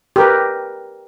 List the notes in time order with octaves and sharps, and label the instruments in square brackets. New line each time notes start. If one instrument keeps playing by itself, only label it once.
[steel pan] G4 A#4 B4